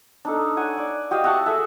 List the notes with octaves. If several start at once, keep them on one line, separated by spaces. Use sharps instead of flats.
D4 D#4 A4
C#5 F#5 G#5
D5
F#4 G4 D#5 F5
F#4 E5 F#5 A5
G#4 A4 E5